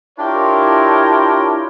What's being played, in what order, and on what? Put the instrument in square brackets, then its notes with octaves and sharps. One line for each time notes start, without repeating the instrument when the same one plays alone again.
[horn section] D4 E4 F4 G4 A#4 C#5